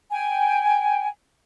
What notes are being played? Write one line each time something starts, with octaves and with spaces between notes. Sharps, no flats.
G5 G#5